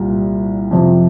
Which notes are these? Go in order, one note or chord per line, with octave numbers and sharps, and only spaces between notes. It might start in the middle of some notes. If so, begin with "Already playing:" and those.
Already playing: C2 A#2 G3
F2 C3 F3